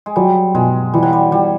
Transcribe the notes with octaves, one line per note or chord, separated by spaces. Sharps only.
G#3
F#3 G3
B2 G#3
E3 G3
F#3
G3
E3 G3